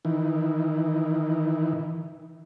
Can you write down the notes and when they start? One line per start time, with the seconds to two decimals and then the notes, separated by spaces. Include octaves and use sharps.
0.05 D#3 E3